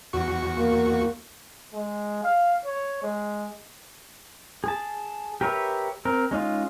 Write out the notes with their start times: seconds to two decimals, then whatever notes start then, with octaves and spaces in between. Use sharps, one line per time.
0.13 E2 F#4 C#6
0.57 A#3
1.74 G#3
2.23 F5
2.65 C#5
3.03 G#3
4.64 G#4 A5
5.41 G4 A#4 B4 C#5 E5
6.05 C4 A#4
6.31 G#3 C#4 D#4 F4